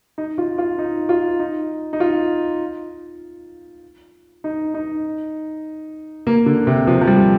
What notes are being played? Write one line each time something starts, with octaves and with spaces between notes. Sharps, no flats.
D#4
F4
F4
D#4
F4
D#4
D#4
F4
D#4
D#4
A#3
D3
C3
F3
F3
G3